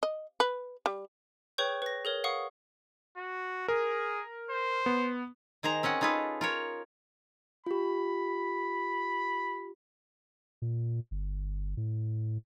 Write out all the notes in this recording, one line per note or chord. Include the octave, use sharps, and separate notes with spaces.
D#5
B4
G3
G#4 B4 C#5 G5 C#6 G6
B4 A#6
G#4 A#4 C#5
F5 F#5 C#6 D#6
F#4
G#4 A#4
C5
B3
D#3 G#4 C5 A#5
C4 C#4 D#5 F#5
D#4 F4 G#4 A4 B4
F4 A#4 C#5
F4 G4 B5
A#2
G1
A2